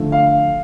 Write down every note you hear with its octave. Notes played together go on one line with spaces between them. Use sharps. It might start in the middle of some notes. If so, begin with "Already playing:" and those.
Already playing: D3 F3 A3
F5